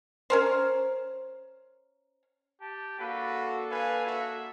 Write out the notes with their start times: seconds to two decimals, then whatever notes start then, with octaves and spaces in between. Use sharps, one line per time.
0.30 C#4 A#4 C5
2.61 G4 A5
2.99 A#3 D4 F#4 A4 B4 F5
3.71 B4 F5 G#5
4.06 F#4 E5